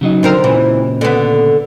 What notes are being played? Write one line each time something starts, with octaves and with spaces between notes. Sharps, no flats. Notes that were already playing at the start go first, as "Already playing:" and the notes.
C#3 F#3 D#4
D3 C4 A#4
A#2 C#3 E3
D3 B3